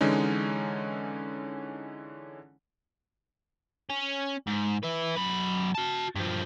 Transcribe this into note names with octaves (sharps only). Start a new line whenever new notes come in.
D3 E3 G#3 C#4 D#4
C#4
G#2
B4 E5
F#2 B5
F#4 A5
G2 F3